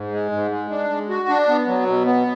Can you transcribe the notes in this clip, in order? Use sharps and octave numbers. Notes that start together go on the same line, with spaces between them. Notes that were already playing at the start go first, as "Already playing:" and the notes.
Already playing: G#2
G#3
G#2
G#3
D4
G#3
F#4
D4
B3
F#3
B2
B3